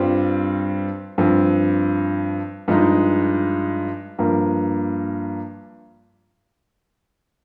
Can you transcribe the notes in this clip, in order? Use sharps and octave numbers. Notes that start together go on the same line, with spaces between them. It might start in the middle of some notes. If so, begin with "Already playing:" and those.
Already playing: G2 G3 C4 F4
G2 F3 C4
G2 F3 G#3 D#4
G2 F3 A#3